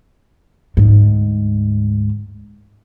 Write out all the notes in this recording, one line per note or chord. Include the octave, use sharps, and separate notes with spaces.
D2 G#2